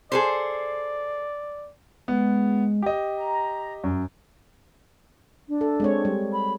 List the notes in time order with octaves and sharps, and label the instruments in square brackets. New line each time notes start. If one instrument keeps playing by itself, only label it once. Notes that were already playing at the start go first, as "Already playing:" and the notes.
[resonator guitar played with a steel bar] G#4 A4 C5 [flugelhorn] D5
[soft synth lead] G#3 [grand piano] B3
[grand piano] G4 D#5
[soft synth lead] A#5
[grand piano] F#2
[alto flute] D4
[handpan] A4
G#3 C4 C#5
G3
[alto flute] B5